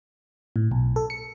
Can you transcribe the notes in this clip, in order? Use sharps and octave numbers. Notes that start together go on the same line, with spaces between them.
A2
B1
A4
C#7